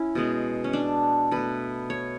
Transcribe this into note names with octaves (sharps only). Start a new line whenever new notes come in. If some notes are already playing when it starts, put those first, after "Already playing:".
Already playing: C#4 E4
B2 G#3 B3
C#4
D4
B2 A3 B4
C#5